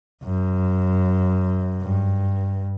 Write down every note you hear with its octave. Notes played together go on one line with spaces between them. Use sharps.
F#2
G2